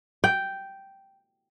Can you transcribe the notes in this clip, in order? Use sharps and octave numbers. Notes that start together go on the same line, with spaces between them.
G5